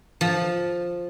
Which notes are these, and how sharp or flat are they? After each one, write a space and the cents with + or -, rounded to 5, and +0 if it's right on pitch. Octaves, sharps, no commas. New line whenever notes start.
F3 +5